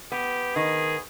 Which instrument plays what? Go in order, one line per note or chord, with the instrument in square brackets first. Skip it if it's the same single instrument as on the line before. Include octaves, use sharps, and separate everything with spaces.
[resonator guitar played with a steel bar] B3 [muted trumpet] G4
[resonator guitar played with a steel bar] D#3 [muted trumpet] G#4